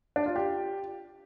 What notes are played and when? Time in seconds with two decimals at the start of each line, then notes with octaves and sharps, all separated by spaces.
0.16 D4
0.26 F4
0.36 G4